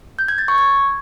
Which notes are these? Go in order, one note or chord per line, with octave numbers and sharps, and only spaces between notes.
G6
G#6
A6
C#6
G#6